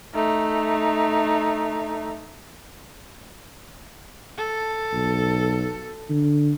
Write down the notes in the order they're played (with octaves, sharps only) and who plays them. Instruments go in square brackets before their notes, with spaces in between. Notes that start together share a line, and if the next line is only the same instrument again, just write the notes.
[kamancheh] A3 D#4
[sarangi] A4
[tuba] B1
D3